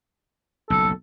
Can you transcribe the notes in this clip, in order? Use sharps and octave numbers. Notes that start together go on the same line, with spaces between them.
F#1 B1 A4